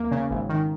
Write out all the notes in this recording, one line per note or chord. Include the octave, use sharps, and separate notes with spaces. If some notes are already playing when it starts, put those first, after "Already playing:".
Already playing: E2 A#3
C#3
G#1
D#3